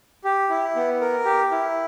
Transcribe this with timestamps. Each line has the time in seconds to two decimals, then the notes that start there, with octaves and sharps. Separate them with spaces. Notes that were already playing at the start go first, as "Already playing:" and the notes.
0.24 G4
0.50 E4
0.76 B3
1.01 A#4
1.25 G4
1.51 E4